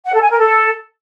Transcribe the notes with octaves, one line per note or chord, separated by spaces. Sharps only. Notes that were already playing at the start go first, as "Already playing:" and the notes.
F#5
A4
G#5
A#4
A4